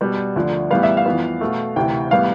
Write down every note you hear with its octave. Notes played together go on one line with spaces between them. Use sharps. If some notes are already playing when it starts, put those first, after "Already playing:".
B2 G3 B3
D2 D3 F3
A2 E3 G3 B3 F5
E5
F5
F2 E3 B3
B2 A3
D2 C3 E3 G5
A2 E3 G3 B3 F5